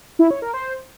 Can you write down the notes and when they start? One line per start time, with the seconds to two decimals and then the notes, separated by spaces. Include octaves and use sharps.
0.19 E4
0.31 C#5
0.42 A#4
0.54 C5